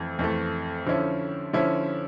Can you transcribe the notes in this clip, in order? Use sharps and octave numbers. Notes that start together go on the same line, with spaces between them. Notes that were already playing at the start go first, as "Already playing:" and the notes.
Already playing: F2 E3 A3
F2 E3 A3
D3 F3 C#4 E4
D3 F3 C#4 E4